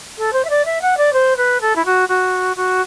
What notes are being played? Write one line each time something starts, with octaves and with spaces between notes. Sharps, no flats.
A4
C5
E5
D5
E5
F#5
D5
C5
B4
A4
E4
F#4
F#4
F#4